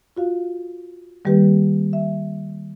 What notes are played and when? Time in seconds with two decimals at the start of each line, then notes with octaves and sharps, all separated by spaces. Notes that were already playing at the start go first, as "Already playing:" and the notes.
0.17 F4 F#4 F5
1.25 D#3 G3 A#3 G4 B4
1.93 E5